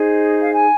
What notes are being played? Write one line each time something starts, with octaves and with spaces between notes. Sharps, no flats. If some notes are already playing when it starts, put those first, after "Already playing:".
Already playing: D#4 G#4 C5
F5
G#5